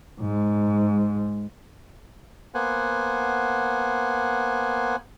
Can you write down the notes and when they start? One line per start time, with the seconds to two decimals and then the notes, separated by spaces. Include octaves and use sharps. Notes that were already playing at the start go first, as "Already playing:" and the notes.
0.21 G#2
2.54 A#3 B3 C5 F#5 G#5